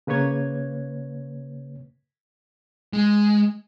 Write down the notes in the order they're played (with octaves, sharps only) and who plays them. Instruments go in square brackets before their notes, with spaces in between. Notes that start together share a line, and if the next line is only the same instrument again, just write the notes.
[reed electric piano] C#3 A#3 B4 C#5 G#6
[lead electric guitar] G#3